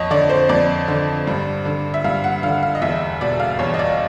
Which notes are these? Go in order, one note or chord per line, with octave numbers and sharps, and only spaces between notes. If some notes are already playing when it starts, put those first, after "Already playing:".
Already playing: F2 C#5 D#5
D3 D5
C5
F2 D5
D3
G2
D3
E5
G2 F5
F#5
D3 F5
F5
D#5
E2 E5
B2 D5
F5
E2 C#5
D#5
D5